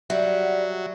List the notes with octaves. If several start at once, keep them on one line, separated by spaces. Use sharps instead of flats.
F#3 G3 D5 E5 F#5